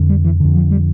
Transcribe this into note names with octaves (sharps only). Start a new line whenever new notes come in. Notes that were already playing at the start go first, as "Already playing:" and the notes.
Already playing: F2 D3
G3
E3
F2 D3
F3
G3